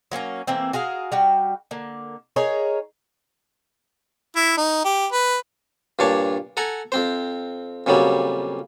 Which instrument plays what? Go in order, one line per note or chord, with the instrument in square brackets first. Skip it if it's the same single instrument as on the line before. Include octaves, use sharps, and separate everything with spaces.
[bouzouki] F#3 A#3 C4 C#4
E3 A3 A#3 C4
F#4 G#4 A#4 F5
G3 F#4 G5
D3 A#3
D#4 G#4 A#4 C#5
[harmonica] E4
D#4
G4
B4
[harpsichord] G2 A#2 D4 C#5 A5
A4 F#5 G#5 A#5
F2 C4 C5
F2 A#2 C#3 F#3 G3